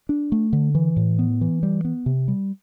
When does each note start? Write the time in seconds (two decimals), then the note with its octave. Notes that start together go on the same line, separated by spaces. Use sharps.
0.09 D4
0.32 A3
0.53 D3
0.75 E3
0.96 A2
1.19 B3
1.41 E3
1.63 G3
1.85 B3
2.06 C3
2.28 G3